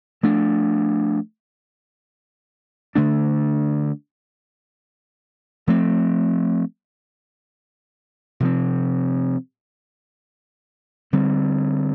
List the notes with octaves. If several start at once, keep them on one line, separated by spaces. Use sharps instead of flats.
F3 A3 D4
D3 A3 D4
F3 A3 C4
C3 F3 C4
D3 G3 C4